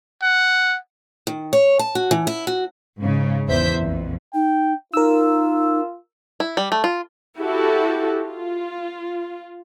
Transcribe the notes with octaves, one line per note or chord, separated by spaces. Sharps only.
F#5
D#3
C#5
A5
F#4
E3
E4
F#4
G#2 C#3
G#1 E2 C5 E5 G6 B6
A#1 F2
D#4 G5
D#4 F4 A#4 E6
E4
G3
A3
F4
E4 F#4 G4 A4
F4